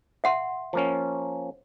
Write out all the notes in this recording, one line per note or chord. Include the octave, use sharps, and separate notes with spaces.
E5 F#5 C6
F3 A#3 C#4